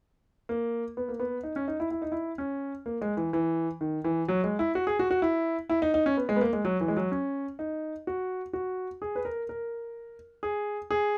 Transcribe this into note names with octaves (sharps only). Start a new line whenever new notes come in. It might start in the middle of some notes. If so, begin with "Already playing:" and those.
A#3
B3
A#3
B3
D#4
C#4
D#4
E4
E4
D#4
E4
C#4
A#3
G#3
E3
E3
D#3
E3
F#3
G#3
E4
F#4
G#4
F#4
F#4
E4
E4
D#4
D#4
C#4
B3
G#3
B3
A#3
G#3
F#3
E3
G#3
F#3
C#4
D#4
F#4
F#4
G#4
B4
A#4
A#4
G#4
G#4